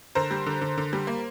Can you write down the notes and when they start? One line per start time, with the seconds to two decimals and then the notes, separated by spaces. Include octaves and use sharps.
0.15 D3 A#4 C5
0.31 G3
0.46 D3
0.61 D3
0.78 D3
0.93 G3
1.07 A#3